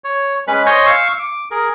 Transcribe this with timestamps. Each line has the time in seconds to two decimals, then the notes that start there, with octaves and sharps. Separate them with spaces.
0.04 C#5
0.47 G#3 C#4 B4 B5
0.66 C5 C#5 D#5 G#5 C#6
0.87 F5 C#6 E6
1.19 D6
1.51 G#4 A#4